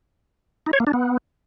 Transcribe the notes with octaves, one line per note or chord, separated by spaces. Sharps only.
D#4
C#5
A#3
D4
B3